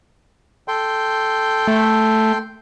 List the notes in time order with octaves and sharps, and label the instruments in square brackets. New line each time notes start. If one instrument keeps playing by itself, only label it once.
[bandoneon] A4 G5 C6
[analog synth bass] A3